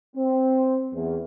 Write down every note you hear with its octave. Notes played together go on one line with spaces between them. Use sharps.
C4
E2